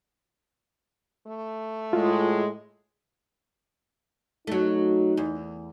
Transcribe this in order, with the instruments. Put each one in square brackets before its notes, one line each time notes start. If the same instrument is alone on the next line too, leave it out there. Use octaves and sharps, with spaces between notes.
[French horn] A3
[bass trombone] A2 [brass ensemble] G#3 [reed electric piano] F4
[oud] F#3 A3 [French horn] D#4
[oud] E2